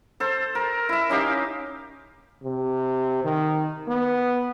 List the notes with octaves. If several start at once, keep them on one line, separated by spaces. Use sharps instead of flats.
A4 C5
A#4
E4 E5
C#4 D#4 G4 F5
C3
D#3
B3